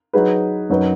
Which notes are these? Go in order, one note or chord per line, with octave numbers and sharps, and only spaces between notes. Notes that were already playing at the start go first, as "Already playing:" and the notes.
F#3 D#4 G#4 B4
F#2 F#3 D#4 B4